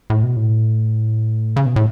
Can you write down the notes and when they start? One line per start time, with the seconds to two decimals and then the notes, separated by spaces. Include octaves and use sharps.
0.10 A2
0.23 B2
0.37 A2
1.56 C#3
1.66 B2
1.76 A2